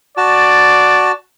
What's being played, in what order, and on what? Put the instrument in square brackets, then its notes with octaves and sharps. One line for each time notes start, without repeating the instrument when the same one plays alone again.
[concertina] F#4 A5 [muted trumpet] D5